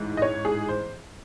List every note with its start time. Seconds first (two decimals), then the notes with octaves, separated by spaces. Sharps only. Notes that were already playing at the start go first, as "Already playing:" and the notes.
Already playing: A1 G#2 E3
0.17 D#5
0.22 C#5
0.45 G#4
0.69 C5